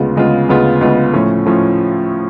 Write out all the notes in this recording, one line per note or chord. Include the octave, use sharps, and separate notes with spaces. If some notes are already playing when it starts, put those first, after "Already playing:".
Already playing: D2 C#3 G#3 B3 F4
D2 C#3 G#3 B3 F4
D2 C#3 G#3 B3 F4
D2 C#3 G#3 B3 F4
A2 F3 A3 C#4
A2 F3 A3 C#4